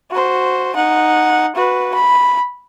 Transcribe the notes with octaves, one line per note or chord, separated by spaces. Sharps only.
F#4 C5
D#4 F#5
F#4 B4
B5